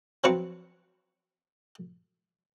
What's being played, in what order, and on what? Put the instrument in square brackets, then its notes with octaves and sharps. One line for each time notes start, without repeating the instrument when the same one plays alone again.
[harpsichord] F3 F#3 C4 B4 C#6